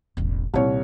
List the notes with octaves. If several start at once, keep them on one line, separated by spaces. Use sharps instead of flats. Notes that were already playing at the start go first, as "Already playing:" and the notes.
E1 A1
C2 A#2 D#3 C#5